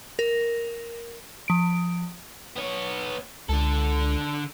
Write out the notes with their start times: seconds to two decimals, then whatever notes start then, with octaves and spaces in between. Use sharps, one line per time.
0.19 A#4
1.48 F3 D7
2.56 B3 C#5
3.49 C#2 D3 A4